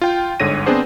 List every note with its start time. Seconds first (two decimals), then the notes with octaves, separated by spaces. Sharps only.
0.01 F4 G5
0.40 G1 G#2 D3 C#5 A#6 D#7
0.66 B3 C4 D4 G#4 C5